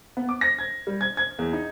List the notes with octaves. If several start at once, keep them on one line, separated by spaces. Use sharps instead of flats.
B3
D6
A#6
G#6
G3
G#6
G#6
E2
D#4